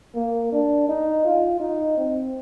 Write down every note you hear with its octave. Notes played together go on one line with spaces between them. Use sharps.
A#3
D4
D#4
F4
D#4
C4